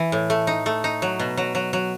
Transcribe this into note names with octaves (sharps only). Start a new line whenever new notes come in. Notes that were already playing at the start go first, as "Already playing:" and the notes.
Already playing: E3
A2
A3
D#4
A3
D#4
F#3
B2
F#3
F#3
F#3